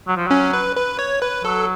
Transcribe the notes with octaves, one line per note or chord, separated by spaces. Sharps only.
F#3
F3
F#3 C#4
B4
B4
C#5
B4
F#3 A4